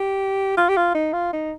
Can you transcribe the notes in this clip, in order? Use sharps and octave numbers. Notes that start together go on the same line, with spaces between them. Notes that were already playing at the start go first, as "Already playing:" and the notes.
Already playing: G4
F4
G4
F4
D#4
F4
D#4